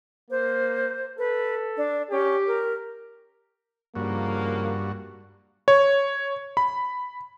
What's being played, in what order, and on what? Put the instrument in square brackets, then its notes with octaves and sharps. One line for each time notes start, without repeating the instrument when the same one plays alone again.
[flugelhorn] A#3 [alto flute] C5
[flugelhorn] A4 [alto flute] B4
[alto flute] D4
[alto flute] C#4 [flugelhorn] G4
[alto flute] A#4
[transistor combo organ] G2 F#4 [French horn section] C#3 F3 A#3
[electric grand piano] C#5
B5